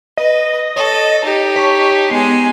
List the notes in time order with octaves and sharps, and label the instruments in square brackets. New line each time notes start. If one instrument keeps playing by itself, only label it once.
[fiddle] B4 [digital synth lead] D#5
[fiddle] A4 [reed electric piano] C#5
[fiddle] D#4 [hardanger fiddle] G4
[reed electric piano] C#5 A5 C#6 [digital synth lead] B6
[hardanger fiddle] G#3 G#5 [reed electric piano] B3 [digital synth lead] C7